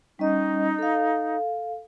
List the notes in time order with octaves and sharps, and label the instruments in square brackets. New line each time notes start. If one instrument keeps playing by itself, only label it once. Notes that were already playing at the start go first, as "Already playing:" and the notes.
[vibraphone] G3 C#4 D#5 [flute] D#4
[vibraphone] A4 F5